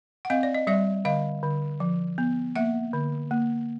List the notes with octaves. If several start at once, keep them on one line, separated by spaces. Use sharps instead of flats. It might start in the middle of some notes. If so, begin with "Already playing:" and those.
F#5
C4 D#5 F5
D5
D#5
G3 D5 E5
D3 D#5 F5
D3
F3
B3
A#3 E5 F#5
D3
A#3